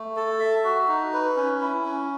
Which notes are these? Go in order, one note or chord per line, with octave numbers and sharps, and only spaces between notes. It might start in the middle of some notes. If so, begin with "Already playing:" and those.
Already playing: A3
A4
E5
F#4
D#4
B4
C#4
E4
C#4